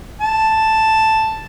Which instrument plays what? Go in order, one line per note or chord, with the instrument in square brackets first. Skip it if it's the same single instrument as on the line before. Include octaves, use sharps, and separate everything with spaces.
[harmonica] A5